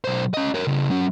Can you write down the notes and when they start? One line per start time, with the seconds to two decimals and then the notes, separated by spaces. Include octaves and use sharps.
0.04 B1 C5
0.34 C#4 D#5
0.55 A#4 C#5
0.67 C#3 E4
0.90 F#3 C#4